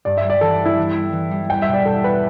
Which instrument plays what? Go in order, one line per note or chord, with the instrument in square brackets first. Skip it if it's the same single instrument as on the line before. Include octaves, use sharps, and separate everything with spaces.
[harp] G2 [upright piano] D5
[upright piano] E5
[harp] G3
[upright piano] D5
[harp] E3 [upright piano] A4
[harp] B3
[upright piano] E4
[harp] E3
G3
E3
G3
[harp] E2 [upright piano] G5
[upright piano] E5
[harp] B2
[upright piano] D5
[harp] B2 [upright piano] A4
[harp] B3 [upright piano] B4